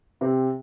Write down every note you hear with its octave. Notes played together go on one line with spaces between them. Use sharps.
C3 C4